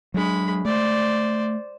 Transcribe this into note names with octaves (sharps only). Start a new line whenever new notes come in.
F#3 G#3 D4 B5
A3 C5 D5